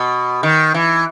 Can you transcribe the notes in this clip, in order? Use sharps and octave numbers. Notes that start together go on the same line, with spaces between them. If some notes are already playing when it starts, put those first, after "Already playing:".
Already playing: B2
D#3
E3